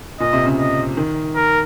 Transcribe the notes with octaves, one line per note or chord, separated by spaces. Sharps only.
A#2 D#5
C3
C#3
D#5
D#3
A#4